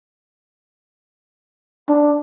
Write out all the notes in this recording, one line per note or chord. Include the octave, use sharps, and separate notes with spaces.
D4